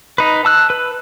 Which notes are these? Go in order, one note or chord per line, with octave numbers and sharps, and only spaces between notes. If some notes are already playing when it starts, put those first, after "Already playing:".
D#4 B4
A5 E6 F#6
B4